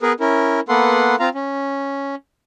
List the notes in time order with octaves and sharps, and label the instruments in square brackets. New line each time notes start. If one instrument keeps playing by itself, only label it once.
[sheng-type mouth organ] B3 G#4 A#4 B4
C#4 E4 A#4
A#3 B3 A4 B4 F#5 C6
C4 F4 F5 A#5
C#4